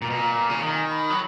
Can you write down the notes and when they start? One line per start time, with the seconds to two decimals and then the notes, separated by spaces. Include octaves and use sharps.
0.02 A#2 A#5
0.10 B2
0.16 A#2 A#5
0.49 C#3
0.61 D#3 A#5
0.75 G#5
0.89 B5
1.10 F#3